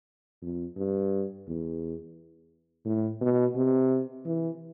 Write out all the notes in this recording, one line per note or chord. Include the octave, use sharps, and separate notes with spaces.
F2
G2
E2
A2
B2
C3
E3